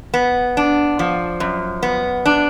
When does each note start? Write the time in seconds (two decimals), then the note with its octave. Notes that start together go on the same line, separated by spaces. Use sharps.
0.14 B3
0.57 D4
0.99 F3
1.40 F#2
1.83 B3
2.26 D4